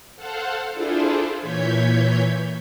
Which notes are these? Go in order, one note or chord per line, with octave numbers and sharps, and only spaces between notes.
A4 C5 F5 F#5
D4 E4 F4 G#4 A4 C5
A#2 E3 C#5 G6 G#6 B6